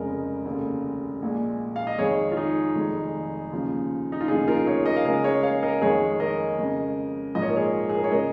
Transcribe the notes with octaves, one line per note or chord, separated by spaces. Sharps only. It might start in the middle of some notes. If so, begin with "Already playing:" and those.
Already playing: F1 F2 C#3 G#3 A#4 D#5
F1 D#2 C#3
A#1 A#2 G#3
F5
D#5
F2 D#3 G#3 G#4 C#5
F4
D#4 G#4
F1 F2 D#3 G#3
D#2 C#3 F3
D#4
F4
F1 D#2 C#3 F3 D#4 G#4
F4 A#4
G#4 C#5
A#4 D#5
F5
C#2 C#3 G#3 A#4 D#5
G#4 C#5
C#5 F5
A#4 D#5
F2 D#3 G#3 G#4 C#5
A#4 D#5
F2 C#3 G#3
A#1 G#2 F3 D#5
C#5
A#4
G#4 C#5
G#4
A#4
C#5
C#3 G#3 A#4 D#5